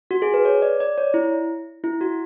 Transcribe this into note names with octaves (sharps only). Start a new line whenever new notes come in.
F#4
G#4
B4
C#5
D5
D5
C#5
E4
E4
F#4